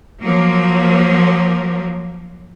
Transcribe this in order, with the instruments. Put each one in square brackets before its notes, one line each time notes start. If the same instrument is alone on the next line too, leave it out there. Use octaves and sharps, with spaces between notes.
[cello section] F3 F#3 A#3